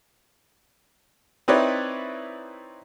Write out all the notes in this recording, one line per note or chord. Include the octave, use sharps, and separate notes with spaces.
C4 D#4 E4 B4 C#5 D5